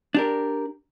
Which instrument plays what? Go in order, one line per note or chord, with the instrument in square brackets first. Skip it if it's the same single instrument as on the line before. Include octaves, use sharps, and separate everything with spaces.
[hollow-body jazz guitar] D4 G4 A#4